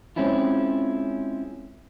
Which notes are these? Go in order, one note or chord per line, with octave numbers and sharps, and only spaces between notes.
G#3 C4 C#4 E4 F4